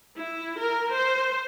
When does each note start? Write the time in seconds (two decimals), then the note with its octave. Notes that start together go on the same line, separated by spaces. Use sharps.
0.19 E4
0.61 A#4
0.95 C5